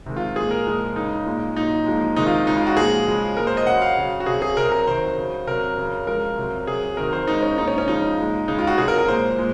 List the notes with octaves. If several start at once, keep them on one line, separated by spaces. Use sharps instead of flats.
C3 D#3 G#3
F4
A#2 G#3 G#4
A#4
A#2 F3 G#3
C#3 G#3 D#4
A#2 G#3
A#2 D#4
F#3
A#2 F3 G#3
C3 D#3 G#3 D#4
F4
C#3 G#3 D#4
F4
F#4
A#2 F3 G#3 G#4
C#3 F3 G#3
A#2 G#3 A#4
C5
D#5
C#3 F#3 F#5
F5
C#3 F#3
F#4
C3 F#3 G#4
G#4
C3 A#4
F#3
A#4
C3 D#3 F#3 C5
C#3 F#3
C3 F#3 A#4
C#3 F#3
C#3 F3 G#3 A#4
C3 F#3
C3 F#3 G#4
C3 D#3 F#3 A#4
C5
C#3 G#3 D#4
C#4
A#2 G#3 D#4
C#4
C#4
C#3 F3 G#3 D#4
A#2 G#3
C#3 G#3 D#4
F4
F#4
C3 F#3 G#4
A#4
A#4
A#2 G#3 C5
A#2 G#3